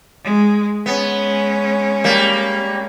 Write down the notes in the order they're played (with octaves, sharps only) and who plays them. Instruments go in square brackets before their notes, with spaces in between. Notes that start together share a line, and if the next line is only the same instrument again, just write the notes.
[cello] G#3
[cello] G#3 C#4 [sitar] B3
[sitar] G3 A#3